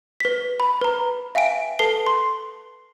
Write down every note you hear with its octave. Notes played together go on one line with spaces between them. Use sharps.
B4 B6
B5
B4 A#5
E5 F5 G5 G#5 D7
A4 B4 A5 C7 G7
C6